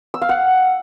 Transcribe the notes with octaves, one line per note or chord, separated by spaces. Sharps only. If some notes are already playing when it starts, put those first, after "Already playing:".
E6
F5
F#5